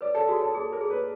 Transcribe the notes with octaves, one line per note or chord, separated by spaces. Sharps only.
B4 D5
A4
F#4 G#4
A4
G#4 A4
A#4
G#4
B4